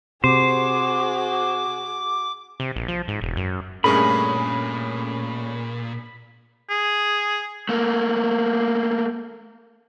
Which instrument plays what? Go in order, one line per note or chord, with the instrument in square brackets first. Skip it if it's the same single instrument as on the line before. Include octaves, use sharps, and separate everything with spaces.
[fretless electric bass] C3 [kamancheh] F#4 G#4 [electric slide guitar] C5 [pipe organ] D6
[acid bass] C3
A#1
F3
G#2
E1
F#2
[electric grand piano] G2 G#4 A#4 [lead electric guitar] A#2 [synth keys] A3 C#4 [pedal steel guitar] B5
[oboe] G#4
[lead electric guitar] A3 A#3